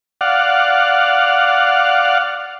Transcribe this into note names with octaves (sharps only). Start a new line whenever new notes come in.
D5 F5 F#5